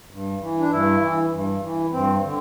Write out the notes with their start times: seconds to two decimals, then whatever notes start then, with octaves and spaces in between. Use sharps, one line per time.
0.11 G2
0.41 E3
0.60 D4
0.71 G2 E4
1.01 E3
1.32 G2
1.62 E3
1.92 G2 C4
2.23 D3